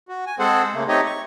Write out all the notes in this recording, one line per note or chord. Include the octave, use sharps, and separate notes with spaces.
F#4
G#5
G#3 C4 G#4 A4 C5 F#5
C#3 A3 A#3
A3 C4 D#4 G4 C#5 D#5
C#6